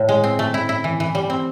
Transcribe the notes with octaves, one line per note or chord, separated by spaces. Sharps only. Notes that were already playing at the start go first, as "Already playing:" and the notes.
Already playing: A2
G#3
C4
A3
E4
E4
E3
E3
G3
C4